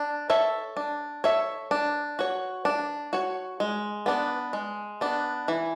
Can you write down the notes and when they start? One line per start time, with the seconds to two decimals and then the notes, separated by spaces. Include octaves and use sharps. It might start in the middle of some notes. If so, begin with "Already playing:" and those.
Already playing: D4
0.30 A4 C#5 E5
0.77 D4
1.24 A4 C#5 E5
1.71 D4
2.19 F#4 C#5
2.65 D4
3.13 F#4 C#5
3.60 G#3
4.06 B3 D4
4.53 G#3
5.01 B3 D4
5.48 E3